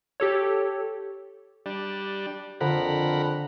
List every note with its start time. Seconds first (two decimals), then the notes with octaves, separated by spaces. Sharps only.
0.20 G4 A4 C#5
1.66 G3 D4
2.61 F2 D3 A#4 F#5 B5